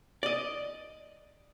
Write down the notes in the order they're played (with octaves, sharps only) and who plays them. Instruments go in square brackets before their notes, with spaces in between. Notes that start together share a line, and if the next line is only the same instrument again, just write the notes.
[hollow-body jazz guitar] D5 D#5